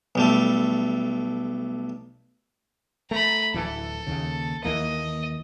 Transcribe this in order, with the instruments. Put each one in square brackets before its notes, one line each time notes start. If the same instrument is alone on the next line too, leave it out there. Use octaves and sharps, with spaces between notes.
[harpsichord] B1 G3 A3
[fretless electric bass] A3 [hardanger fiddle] A#5 B5
[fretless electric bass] D1 E3 [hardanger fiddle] A4
[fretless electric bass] D#2 C#3
[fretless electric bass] D#2 E3 A#3 [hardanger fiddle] D#5